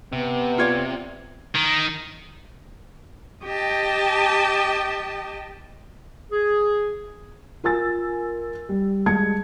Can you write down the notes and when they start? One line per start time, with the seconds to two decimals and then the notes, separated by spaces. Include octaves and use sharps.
0.13 C3 B3
0.58 F4 C#5 D5
1.55 D#3
3.44 G4 D#5 G5 A5
6.32 G#4
7.64 F4 A#4 G#5 E6 A6
8.69 G3
9.06 G3 G#3 G#4 A5 G#6 C#7